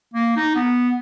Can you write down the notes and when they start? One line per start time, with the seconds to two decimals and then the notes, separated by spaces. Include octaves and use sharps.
0.14 A#3
0.36 D#4
0.55 B3